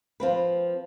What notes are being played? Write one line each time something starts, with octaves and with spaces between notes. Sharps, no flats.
F3 C4 B4